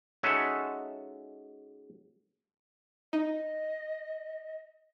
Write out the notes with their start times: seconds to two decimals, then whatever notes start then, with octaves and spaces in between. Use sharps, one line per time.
0.23 G#3 C#4 D#4 F#4 A4 E5
3.13 D#4 D#5